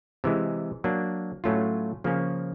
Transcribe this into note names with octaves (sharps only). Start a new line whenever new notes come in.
C3 E3 G#3
F#3 A#3 D4
A2 F#3 A3 C#4 F4
C#3 F3 A#3 C#4